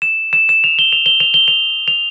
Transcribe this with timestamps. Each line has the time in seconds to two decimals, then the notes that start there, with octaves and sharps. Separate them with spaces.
0.02 E7
0.33 E7
0.49 E7
0.64 F7
0.79 G7
0.93 F7
1.06 G7
1.20 F7
1.34 G7
1.48 F7
1.88 F7